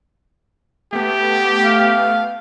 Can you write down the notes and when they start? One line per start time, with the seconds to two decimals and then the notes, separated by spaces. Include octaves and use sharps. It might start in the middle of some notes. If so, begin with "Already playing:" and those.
0.93 A3 B3 G4
1.65 F5